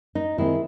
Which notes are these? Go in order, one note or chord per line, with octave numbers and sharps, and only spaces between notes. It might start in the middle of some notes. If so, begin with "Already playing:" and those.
D#4
D#3 G#3 C4 E4